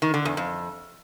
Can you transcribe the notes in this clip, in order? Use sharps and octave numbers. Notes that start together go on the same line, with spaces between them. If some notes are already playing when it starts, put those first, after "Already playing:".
D#3
D3
E2
F2